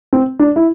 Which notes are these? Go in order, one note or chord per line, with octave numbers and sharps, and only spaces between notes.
C4
D4
E4